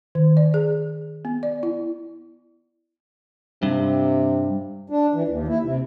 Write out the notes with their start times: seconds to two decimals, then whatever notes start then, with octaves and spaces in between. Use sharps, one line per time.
0.15 D#3
0.37 D5
0.54 G#4
1.25 B3
1.43 D5
1.63 E4
3.63 G2 C3
4.90 D4
5.13 E3
5.28 D#2
5.48 E4
5.63 C3